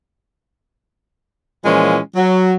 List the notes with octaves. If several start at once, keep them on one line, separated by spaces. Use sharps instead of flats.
A#2 E3 F3 G#3 C#4 F4
F#3